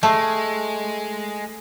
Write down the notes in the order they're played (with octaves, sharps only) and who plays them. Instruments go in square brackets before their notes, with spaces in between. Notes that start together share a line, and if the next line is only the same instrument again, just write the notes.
[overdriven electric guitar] G#3 [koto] A3